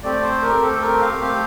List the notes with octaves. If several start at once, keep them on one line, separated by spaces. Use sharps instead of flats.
A3 C4 G4 D5
C5
A#4
A3 C4 G4 A4
A#4
F5
A3 C4 G4